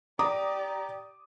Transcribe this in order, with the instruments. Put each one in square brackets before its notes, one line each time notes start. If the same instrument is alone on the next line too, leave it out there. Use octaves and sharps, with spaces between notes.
[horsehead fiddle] G4 D5 [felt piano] A#5 D6 D#6